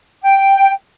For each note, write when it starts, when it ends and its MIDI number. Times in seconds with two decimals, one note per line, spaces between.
0.23 0.72 79